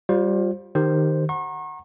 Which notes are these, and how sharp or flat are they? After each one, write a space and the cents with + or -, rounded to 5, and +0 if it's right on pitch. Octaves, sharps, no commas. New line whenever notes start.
G3 +0 F4 +25 C5 +20
D#3 -15 G4 +0 C5 +0
F#5 +0 A#5 +0 C#6 -40